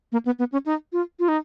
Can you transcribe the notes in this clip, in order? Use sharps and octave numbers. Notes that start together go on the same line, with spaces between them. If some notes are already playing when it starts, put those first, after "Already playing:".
A#3
B3
B3
C#4
D#4
F4
F4
D#4